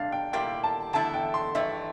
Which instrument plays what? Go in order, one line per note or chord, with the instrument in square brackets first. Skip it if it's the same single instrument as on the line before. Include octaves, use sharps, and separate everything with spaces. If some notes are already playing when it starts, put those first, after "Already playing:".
Already playing: [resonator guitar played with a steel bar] C3 G3 D4 [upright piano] F5
[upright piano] G5
[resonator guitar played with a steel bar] A#2 G3 A#3 E4 G4 [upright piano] G5
[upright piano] A5
[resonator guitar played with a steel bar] E2 D3 A3 E4 [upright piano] A5
[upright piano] G5
C6
[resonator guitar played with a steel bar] G2 E3 A3 [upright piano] E5